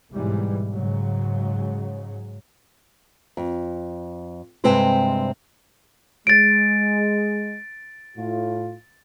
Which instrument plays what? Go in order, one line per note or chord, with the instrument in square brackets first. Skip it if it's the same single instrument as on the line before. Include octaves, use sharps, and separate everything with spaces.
[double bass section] B1 G#2 E3 G3
G#2 C#3 F#3
[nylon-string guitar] F2
G2 C3 G#3 C4 B4 C5
[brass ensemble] G#3 [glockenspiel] A6 D7
[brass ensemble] A2 F4